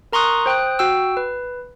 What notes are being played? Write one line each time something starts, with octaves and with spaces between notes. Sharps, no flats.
A#4 A#5 C6 C#6 D#6 F#6
C5 G5 D#6 F#6
F#4 G5 E6
B4